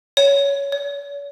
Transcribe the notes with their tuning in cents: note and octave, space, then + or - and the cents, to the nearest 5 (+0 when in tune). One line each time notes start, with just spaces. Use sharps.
C#5 +15
C#5 +45